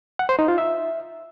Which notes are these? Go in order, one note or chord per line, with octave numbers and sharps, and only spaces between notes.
F#5
C5
D#4
F4
E5